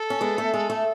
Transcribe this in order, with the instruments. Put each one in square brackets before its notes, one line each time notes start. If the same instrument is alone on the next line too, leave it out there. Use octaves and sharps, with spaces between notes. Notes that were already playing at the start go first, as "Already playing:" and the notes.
Already playing: [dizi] A4
[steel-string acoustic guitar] C#4
G#3 B3
A3
G#3
A3